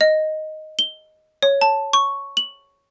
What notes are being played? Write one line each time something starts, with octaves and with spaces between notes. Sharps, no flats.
D#5
G7
C#5
A5
C#6
F#7